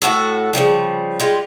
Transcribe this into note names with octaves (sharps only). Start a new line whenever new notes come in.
A2 D#3 F#4 A4
C#3 E3 F3 G3
G3 G#3 F4